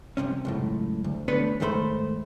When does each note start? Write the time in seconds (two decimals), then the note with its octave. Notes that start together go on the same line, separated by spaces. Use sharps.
0.17 C2 G#2 C3 C#4
0.45 C#2 F#2 A2
1.04 D2
1.28 A3 B3 D4 B4 C#5
1.60 D#2 G#2 D#3 A3 C5 B5